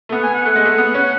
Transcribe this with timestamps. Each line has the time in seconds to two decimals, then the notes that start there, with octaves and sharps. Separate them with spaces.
0.09 A3
0.12 B3 F#5
0.23 G#5
0.34 F#5
0.45 A3
0.56 G#3
0.65 A3
0.78 B3
0.94 C#4